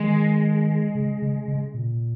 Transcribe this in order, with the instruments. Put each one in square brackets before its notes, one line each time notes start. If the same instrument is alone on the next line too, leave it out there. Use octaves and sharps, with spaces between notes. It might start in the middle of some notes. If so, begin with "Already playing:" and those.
Already playing: [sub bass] D#3 [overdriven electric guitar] G#3
[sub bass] C#3
C#3
C#3
A#2